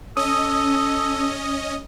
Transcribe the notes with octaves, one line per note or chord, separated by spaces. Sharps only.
C#4 A4 D#5 D#6